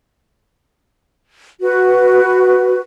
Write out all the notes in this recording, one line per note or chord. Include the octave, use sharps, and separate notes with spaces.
F#4 B4